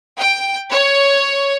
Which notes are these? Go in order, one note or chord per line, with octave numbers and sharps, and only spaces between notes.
G5
C#5